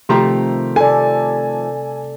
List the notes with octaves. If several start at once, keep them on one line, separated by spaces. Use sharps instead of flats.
C3 D#3 F3 A3 G4 A#5 C6
A4 D5 G#5